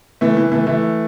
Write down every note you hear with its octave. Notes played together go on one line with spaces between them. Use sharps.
E3 A3
E3
E3 A3
E3 A3